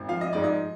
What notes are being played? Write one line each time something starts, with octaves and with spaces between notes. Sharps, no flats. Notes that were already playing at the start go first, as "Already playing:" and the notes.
Already playing: G#1
F3 F5
D#5
G#2 D5
D#5